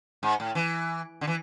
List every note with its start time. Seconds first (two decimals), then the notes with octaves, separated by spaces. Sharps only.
0.23 G#2
0.40 A2
0.55 E3
1.21 D3
1.27 E3